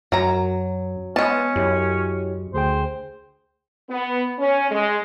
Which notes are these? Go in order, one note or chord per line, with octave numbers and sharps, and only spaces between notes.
F#2 F#3 A#5
G#3 B3 C#4 A5
F#2 E4 G4 C#5
D2 G#4 C5 G5
B3
C#4
G#3